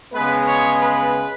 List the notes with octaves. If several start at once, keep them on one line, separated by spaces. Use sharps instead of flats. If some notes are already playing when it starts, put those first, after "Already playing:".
C#3 G#3 B3 B4
C#5
B4